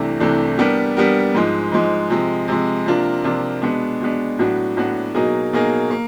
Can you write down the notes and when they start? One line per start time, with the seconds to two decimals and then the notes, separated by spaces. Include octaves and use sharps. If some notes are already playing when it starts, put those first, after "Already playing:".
Already playing: C2 C3 E3 A3 D4
0.20 C2 C3 E3 A3 D4
0.58 G3 B3 D4 G4 A#4
0.97 G3 B3 D4 G4 A#4
1.34 G#2 F3 G#3
1.72 G#2 F3 G#3
2.10 C3 F3 G#3
2.48 C3 F3 G#3
2.86 C3 F3 A#3 D4 F4
3.24 C3 F3 A#3 D4 F4
3.62 B2 G#3 B3 D4
4.00 B2 G#3 B3 D4
4.39 A2 F#3 B3 D4 F#4
4.77 A2 F#3 B3 D4 F#4
5.15 B2 F#3 A#3 D#4 G#4
5.53 B2 F#3 A#3 D#4 G#4
5.91 A#3